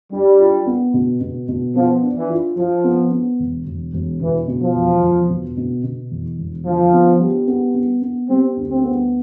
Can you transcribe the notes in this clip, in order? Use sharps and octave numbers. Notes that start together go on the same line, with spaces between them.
G3 D4
F4
B3
B2
B2
B2
F3 B3
D4
E3
F4
F3 F4
B3
B3
E1
E1
E1
B2 E3
B2
F3
E1
E1
B2
B2
B2
E2
E1
D3 F3
B3
G3
B3
B3
B3
G3 C4
D2
C4
B3